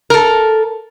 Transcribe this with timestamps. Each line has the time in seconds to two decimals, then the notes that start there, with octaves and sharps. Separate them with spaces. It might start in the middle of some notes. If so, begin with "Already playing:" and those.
0.10 A4 A#4